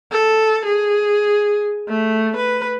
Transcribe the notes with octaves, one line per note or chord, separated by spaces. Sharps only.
A4
G#4
A3
B4